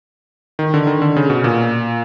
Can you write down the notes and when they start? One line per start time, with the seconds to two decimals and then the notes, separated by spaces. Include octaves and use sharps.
0.59 D#3
0.74 D3
0.87 D#3
1.02 D3
1.16 C#3
1.30 B2
1.44 A#2